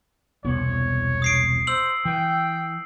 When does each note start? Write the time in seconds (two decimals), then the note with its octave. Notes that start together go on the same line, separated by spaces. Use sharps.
0.44 E1 C2 B3 C#5
1.22 D#6 C7 D7
1.67 C5 E6 F#7
2.05 E3 G5